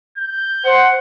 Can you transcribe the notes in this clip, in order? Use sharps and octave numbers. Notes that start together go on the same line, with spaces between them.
G6
C5 F#5